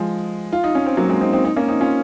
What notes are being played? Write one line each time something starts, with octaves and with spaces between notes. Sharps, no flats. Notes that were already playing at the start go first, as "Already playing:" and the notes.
Already playing: F3 G#3
F4
D#4
C#4
C4
F#3 A#3
G#3 C4
C4 D#4
C4 D#4
C4 D#4
A#3 C#4
C4 D#4
C#4 F4